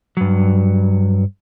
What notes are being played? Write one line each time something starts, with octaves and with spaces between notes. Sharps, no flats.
G2 F#3